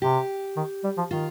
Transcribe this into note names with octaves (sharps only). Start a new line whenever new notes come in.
C3 G4
D#3
G3
F3
D#3 F4